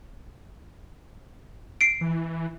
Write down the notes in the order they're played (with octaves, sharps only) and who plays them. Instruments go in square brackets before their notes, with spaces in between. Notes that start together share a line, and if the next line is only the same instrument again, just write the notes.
[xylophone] C7 D7
[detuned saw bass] E3